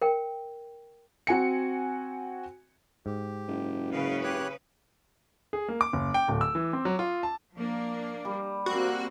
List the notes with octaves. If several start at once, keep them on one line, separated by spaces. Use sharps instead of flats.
A#4 G5
C4 F#4 G#5 C#7
G#2 G4
F#1
C#3 B4 F5
G4 C#5 F#6
G#4
A#3
D6
F#1
G5
D1
E6
E3
C4
F#3
F4
A5
F3 A#3 D4
G3
A#3 C4 F#4